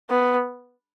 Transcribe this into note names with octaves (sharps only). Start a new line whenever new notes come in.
B3